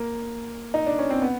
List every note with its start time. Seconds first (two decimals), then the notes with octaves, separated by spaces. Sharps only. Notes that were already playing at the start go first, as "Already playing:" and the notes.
Already playing: A#3
0.74 D#4
0.86 D4
0.99 C#4
1.10 C4
1.22 B3